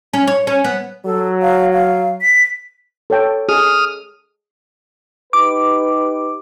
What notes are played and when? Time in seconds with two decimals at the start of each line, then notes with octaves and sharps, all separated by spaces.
0.13 C#4
0.27 C#5
0.47 C#4
0.64 B3
1.05 F#3 A4
1.42 F5
1.73 F5
2.22 B6
3.10 A4 C#5 G5
3.49 G#4 D#6 F6
5.33 D#4 G4 B4 D6